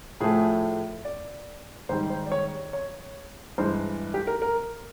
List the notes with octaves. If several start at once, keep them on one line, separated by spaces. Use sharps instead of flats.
A2 F3 A3 G#4
D5
G#2 D#3 G3 C5
C5
D5
C#5
C#5
G2 E3 G#3 C5
G4
A#4
A#4